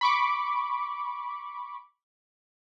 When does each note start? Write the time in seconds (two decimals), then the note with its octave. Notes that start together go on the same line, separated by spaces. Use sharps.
0.01 B5 C#6 D6